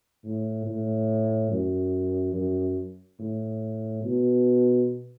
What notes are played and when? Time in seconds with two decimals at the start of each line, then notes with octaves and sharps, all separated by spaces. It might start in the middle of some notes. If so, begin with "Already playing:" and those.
0.24 A2
0.66 A2
1.51 F#2
2.34 F#2
3.19 A2
4.03 B2